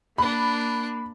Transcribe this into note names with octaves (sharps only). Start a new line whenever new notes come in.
A#3 D4 B5 F#6